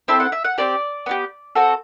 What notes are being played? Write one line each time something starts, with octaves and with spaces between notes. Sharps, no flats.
C4 E4 A4 E5
F#5
E5
F#5
C4 G4 D5
B3 D4 G4
C4 F#4 A4